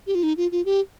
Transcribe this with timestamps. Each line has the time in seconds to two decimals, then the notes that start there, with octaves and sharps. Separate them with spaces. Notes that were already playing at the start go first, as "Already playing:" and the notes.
0.07 G4
0.15 F4
0.23 D#4
0.37 F4
0.52 F4
0.65 G4